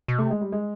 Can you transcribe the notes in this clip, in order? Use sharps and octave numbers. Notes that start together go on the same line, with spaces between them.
B2
C3 A3
G#3
G3
G#3